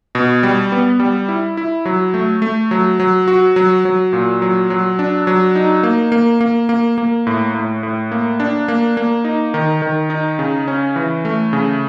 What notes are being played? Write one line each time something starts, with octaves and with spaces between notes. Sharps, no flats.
B2
G3
B3
G3
E4
E4
F#3
A3
A3
F#3
F#3
F#4
F#3
F#3
A#2
F#3
F#3
D4
F#3
D#4
A#3
A#3
A#3
A#3
A#3
A2
A2
A2
A#3
D4
A#3
A#3
D#4
D#3
D#3
D#4
C#3
C#4
E3
A3
C#3